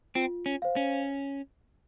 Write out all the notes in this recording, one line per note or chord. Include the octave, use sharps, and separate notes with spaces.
C4 F4
C#4
C5 F5
C#4